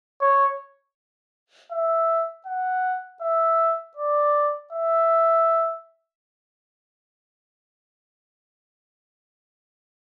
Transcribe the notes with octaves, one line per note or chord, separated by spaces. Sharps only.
C#5
E5
F#5
E5
D5
E5